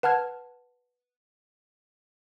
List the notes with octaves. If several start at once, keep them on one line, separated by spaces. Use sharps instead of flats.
B4 F#5 A5 F6 G#6